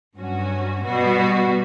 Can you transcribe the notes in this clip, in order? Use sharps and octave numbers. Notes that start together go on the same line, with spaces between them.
G2 F#3 C#4 F#4
B2 G3 B3 F#4